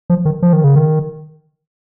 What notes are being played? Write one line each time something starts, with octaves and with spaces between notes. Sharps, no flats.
F3
D#3
F3
D#3
C#3
D#3